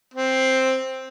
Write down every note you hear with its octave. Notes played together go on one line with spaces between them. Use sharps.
C4